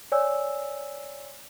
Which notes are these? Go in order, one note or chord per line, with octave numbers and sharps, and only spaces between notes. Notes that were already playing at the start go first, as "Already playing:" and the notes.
C#5 D5 G#5 E6